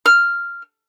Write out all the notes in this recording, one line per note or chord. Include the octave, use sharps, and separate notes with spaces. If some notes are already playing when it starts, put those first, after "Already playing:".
F6